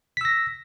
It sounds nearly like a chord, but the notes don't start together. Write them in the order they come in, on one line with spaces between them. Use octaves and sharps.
B6 E6 A#6